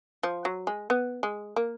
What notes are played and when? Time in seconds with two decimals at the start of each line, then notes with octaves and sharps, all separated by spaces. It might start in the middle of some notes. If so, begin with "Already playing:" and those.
0.23 F3
0.45 F#3
0.67 G#3
0.90 B3
1.23 G#3
1.56 A#3